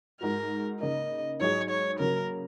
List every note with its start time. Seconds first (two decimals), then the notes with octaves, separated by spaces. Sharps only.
0.21 G#2 G#3 F#4 A#4
0.81 C#3 A#3 D#4 D#5
1.40 G#2 F#3 D#4 G#4 C#5
1.70 C#5
1.99 C#3 F#3 A#3 A#4